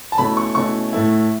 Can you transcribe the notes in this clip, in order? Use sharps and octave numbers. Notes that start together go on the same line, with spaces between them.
A5
B2 A3 C#4 E4 B5
C#6
B2 A3 C#4 E4 C#6
A2 A3 E4